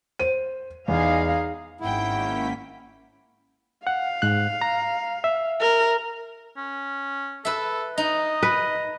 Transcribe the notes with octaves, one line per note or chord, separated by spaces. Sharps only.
C5 D#7
E2 D#4 G#4 F5
G#1 G#2 A#3 C#4 E4 F#5 G5 B6
F5 F#5
G#2 F#6
A#5
E5
A#4
C#4
A4 B4 E5
D#4 D#5
B4